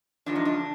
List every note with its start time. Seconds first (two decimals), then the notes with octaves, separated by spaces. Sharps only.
0.26 E2 C#3 F3 G#3 D4
0.35 D#4
0.45 D4